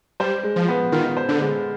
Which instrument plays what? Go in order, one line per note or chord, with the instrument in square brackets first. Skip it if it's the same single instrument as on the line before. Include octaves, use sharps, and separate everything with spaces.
[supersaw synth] G3 [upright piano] C5
[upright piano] G#3
[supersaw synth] F3
[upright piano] B3
[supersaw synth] D#3 [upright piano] F4
[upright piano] C5
[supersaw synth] D3
[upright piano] G#3